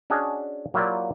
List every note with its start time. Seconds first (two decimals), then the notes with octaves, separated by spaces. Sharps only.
0.10 C#4 D4 F#4 G#4 D#5
0.74 F#3 A#3 E4 F4 G4 D5